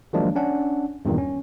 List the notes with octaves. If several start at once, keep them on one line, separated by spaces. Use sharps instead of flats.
D#3 F3 F#3 G#3 A#3 D4
C#4 D4 F#5
E2 G2 A#2 D#3
C#4